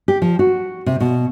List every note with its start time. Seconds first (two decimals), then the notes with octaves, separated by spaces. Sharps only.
0.08 G4
0.22 F3
0.39 F#4
0.86 C3
1.00 B2